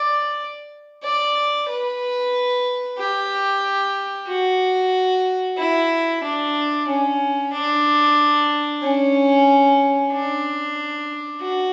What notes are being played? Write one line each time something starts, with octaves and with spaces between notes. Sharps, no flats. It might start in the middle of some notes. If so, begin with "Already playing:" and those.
Already playing: D5
D5
B4
G4
F#4
E4
D4
C#4
D4
C#4
D4
F#4